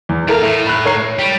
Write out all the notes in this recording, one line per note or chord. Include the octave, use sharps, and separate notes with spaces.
E2
D#2 E4 A4 A#4 F5
A2 A3 E4
B5 F#6
C#5 A#5 C7
G3